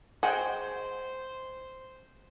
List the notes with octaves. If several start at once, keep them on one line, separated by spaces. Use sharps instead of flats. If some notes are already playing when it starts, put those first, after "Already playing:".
G#3 F#4 C5 G5 G#5